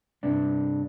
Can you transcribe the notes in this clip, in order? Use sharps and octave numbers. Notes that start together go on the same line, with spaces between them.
G2 C3 D4